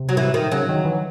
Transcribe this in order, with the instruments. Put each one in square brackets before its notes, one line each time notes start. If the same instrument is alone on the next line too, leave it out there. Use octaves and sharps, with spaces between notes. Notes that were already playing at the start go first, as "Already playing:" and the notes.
Already playing: [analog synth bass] C3
[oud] F#3
E3
D#3
[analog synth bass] C#3 [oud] F#3
[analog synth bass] D#3
E3